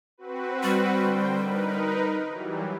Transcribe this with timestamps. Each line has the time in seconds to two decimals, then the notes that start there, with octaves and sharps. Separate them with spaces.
0.18 C4 F#4 B4
0.63 G3
0.94 D3 C5 G5
1.35 D#4 A#4 B4
2.28 E3 F#3 G3